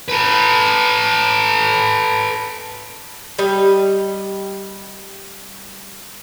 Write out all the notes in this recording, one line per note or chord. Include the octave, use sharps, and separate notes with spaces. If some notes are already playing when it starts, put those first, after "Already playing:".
A4 B4
G3 D#5